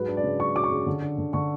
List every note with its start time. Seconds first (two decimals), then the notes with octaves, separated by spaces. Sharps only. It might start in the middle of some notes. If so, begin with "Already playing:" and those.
Already playing: G#2 F#3 B4
0.08 D4
0.17 D5
0.24 C#3
0.40 F#3 C#6
0.56 F#3 D6
0.64 C#6
0.72 C#3
0.87 D3
1.02 D4
1.18 D3
1.33 D3 C#6